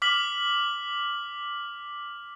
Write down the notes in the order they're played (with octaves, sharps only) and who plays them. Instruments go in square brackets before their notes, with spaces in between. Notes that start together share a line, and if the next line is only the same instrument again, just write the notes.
[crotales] D6 F6 B6 F#7